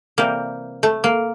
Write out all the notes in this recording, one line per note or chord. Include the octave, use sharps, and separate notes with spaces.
C3 E3 G3 A#3
A3
A#3